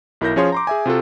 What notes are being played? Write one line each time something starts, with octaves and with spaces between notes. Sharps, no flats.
B1 E4 A#4 E5 G6 A#6
F3 C#4 G#4 C#5 F5 C6
A#5 C6 D6
G#4 E5 G#5
C3 F4 F#4 A4